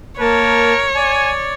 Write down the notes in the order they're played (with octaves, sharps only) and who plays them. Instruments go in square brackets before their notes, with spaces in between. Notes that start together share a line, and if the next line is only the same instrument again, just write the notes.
[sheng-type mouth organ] A#3 A5 [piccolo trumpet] A#4 [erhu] C#5
[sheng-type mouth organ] D5 [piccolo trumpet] G#5